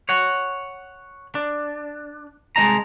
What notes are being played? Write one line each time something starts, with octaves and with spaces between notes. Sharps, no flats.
C#5 F#5
D4
C2 G#3 D#4 D#5 A5 A#5